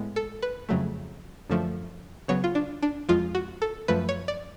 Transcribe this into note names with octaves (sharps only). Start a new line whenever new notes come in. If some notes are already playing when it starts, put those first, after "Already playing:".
Already playing: A2 G#3 B3
A4
B4
F2 C#3 F#3 A3
F#2 D3 F3 A3
C#3 F#3 B3 C#5
F4
D4
D4
F2 F3 G#3 F4
F#4
A4
F#2 F3 A3 B4
C#5
D5